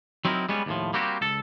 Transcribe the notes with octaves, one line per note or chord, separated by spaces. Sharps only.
F#3 C4 D#4 E4 G4 A#4
G3 G#3 B3 C#4
D#2 A2 F3
G3 A#3 C4 F#4 G4
C#2 A4